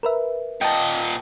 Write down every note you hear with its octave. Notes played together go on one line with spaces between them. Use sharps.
A#4 B4 E5
A#2 D#5 G5 A5